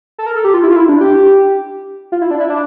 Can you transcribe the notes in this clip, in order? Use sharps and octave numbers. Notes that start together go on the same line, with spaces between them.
A4
A#4
A4
G4
F4
E4
F4
E4
D4
G4
F4
E4
D4
E4
D4